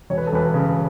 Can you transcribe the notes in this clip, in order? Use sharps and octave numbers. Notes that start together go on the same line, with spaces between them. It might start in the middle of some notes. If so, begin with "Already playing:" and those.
E1 C#5
B4
A4
E1 B4
C#3